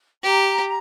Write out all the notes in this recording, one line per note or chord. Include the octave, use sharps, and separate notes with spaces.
G4 A#5